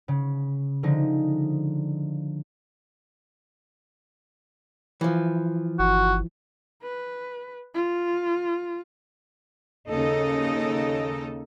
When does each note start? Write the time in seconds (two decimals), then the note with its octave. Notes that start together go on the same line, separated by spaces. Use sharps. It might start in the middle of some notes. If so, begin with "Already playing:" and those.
0.08 C#3
0.83 D3 F3 G#3 D#4
5.01 E3 F3
5.79 G1 F#4
6.83 B4
7.74 F4
9.89 D#2 C#3 D#4 A4 D#5